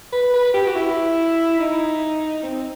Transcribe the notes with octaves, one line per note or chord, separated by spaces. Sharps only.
B4
B4
G4
F#4
E4
D#4
C4